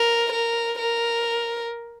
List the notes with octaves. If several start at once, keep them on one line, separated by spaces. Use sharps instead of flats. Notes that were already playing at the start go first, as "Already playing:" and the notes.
Already playing: A#4
A#4
A#4